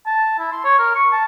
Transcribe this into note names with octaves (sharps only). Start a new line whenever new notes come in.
A5
E4
C6
C#5
A#4
C#6
A5